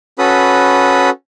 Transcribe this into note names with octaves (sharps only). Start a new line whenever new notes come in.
C#4 F#4 A4 B4 B5 D#6